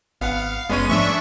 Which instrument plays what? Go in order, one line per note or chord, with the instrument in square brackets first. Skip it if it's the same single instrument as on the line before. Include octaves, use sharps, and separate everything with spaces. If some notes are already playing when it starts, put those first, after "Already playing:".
[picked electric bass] G#1 [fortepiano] B3 F#5 [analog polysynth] F5
[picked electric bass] F#1 [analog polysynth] G#3 D#7 [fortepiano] B3 C#4 C#5
[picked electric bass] G#2 F3 A3 [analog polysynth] D4 E5 C#6